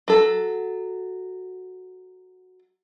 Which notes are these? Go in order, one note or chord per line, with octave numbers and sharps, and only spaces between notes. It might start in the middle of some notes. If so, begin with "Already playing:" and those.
F#3 A4